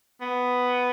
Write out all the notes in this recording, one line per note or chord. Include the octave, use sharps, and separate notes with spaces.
B3